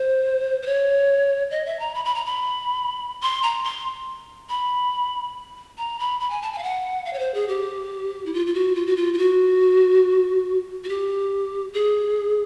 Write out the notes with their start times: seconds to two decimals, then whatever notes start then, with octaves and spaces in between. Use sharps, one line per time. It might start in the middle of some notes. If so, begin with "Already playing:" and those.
Already playing: C5
0.62 C5
0.66 C#5
1.51 D#5
1.66 E5
1.79 A#5
1.95 B5
2.05 B5
2.15 A#5
2.26 B5
3.22 C6
3.43 A#5
3.64 C6
4.49 B5
5.78 A#5
5.99 B5
6.20 B5
6.30 G#5
6.42 A5
6.53 G#5
6.58 F5
6.63 F#5
7.05 F5
7.13 C#5
7.19 C5
7.34 G#4
7.48 G4
8.26 E4
8.34 F4
8.47 F4
8.54 F#4
8.75 F4
8.87 F#4
8.96 F4
9.14 F4
9.18 F#4
10.84 F#4
10.89 G4
11.74 G#4